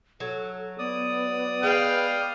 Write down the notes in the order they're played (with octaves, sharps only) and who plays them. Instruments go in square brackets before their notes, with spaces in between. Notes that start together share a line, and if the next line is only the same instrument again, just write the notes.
[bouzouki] F#3 [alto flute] A4
[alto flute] B3 [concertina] D5 D#6
[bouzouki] G#3 B4 [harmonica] F5 G5